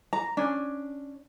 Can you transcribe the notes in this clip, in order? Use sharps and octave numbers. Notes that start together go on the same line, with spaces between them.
A#5
C#4 D4